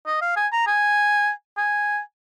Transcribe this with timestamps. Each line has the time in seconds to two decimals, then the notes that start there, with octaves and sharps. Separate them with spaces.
0.07 D#5
0.21 F5
0.36 G#5
0.52 A#5
0.67 G#5
1.57 G#5